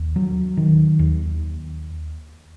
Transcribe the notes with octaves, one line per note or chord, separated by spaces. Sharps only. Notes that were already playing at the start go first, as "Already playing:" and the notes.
Already playing: D#2
F#3
D#3
D#2